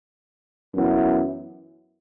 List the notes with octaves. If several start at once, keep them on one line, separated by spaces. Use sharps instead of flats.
F#2 E3 B3 E4